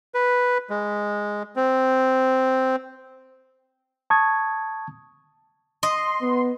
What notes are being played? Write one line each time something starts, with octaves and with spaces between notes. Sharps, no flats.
B4
G#3
C4
A5 C#6 D#6 G#6
D#5 C6
B3